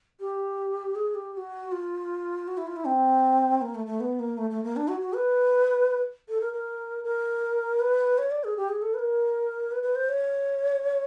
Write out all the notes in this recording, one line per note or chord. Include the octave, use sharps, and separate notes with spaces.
G4
G#4
G4
G4
F#4
F4
F#4
E4
F4
E4
C4
A#3
A3
A3
B3
A#3
A3
A3
A#3
D4
F#4
F#4
B4
A4
A#4
A#4
A#4
B4
C#5
D5
G#4
G4
G#4
A4
B4
A#4
B4
B4
C5
C#5